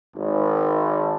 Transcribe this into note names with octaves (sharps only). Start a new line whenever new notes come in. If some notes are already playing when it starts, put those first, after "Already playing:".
G#1